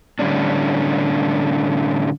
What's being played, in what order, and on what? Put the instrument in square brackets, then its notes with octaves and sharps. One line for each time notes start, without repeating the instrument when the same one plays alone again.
[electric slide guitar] A2 D3 G3 C#4 D4